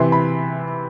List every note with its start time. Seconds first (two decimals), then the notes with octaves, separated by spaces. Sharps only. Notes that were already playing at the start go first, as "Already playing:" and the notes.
Already playing: C3 E3 C6
0.12 B5